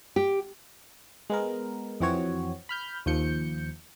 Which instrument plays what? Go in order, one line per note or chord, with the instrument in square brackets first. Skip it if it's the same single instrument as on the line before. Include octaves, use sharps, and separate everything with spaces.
[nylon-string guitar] G4
[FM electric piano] G#3 B3 A#4
F2 E3 C4 F#4 C#5
B5 F6 G6
D#2 F3 G6 C#7